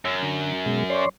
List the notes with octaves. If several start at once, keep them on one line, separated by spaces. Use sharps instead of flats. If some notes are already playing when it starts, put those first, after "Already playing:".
F#2 E6
D3
B2 G#3
C#5 D5 C6